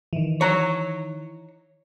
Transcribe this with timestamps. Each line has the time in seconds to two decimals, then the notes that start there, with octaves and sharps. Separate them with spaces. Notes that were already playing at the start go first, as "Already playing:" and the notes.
0.13 D#3 E3
0.41 C#5 A#5